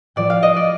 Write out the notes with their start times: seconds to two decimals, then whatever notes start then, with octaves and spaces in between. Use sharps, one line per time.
0.16 A2 F3 D5
0.30 F5
0.43 D#5
0.56 D5